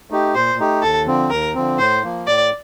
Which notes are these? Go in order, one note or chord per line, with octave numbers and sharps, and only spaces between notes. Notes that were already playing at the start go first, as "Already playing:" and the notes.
A3 D#4 G4
A#2 C5
A3 D#4 G4
D#2 A4
D3 F3 C4
D#2 A#4
D3 F3 C4
A2 C5
F3 A#3
A2 D5